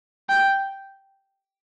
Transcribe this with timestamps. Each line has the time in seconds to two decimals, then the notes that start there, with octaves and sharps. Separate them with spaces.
0.29 G5